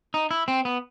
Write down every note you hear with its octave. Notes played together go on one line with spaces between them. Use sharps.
D#4
E4
C4
B3